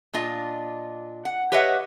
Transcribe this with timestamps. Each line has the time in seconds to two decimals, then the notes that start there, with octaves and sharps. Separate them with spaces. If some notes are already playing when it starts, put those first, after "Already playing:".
0.13 A#2 D4 F4 D#5
1.25 F#5
1.52 G4 B4 C#5 D#5 E5 F#5